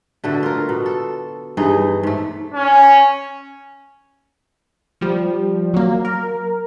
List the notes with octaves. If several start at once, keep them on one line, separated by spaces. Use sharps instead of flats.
B2 D3 A3
F4 A#4
B2
A4
G2 E3 D#4 G#4
G#2 A3
C#4
F3 G3
F#3 A#3
A#4